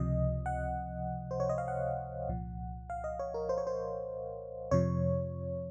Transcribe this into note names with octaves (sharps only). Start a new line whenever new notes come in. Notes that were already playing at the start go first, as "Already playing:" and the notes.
Already playing: C#2 C3 F3 D#5
F#5
C5
C#5
D#5
F5
F#5
C2 A#2 F3
F5
D#5
C#5
A#4
C5
C#5
C5
F2 C3 F3 C#5